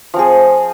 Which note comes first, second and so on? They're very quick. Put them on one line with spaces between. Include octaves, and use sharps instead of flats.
F3 C4 G#4